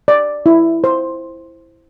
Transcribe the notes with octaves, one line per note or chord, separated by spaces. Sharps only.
D5
E4
C5